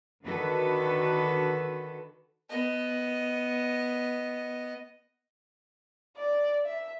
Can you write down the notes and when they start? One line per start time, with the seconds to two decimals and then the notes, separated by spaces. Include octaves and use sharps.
0.23 D3 D#3 F#4 A4 B4
2.50 B3 D#5
6.17 D5
6.65 E5